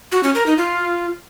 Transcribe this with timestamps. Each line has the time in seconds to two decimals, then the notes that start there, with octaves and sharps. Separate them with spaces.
0.12 F#4
0.23 C#4
0.35 A#4
0.46 D#4
0.58 F4